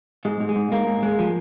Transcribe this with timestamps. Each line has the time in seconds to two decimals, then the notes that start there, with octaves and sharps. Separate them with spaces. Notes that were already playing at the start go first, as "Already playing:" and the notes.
0.25 G#2 G#3
0.40 G#2
0.49 G#3
0.56 G#2
0.71 G#2 A#3
0.87 G#2
1.03 G#3
1.19 F3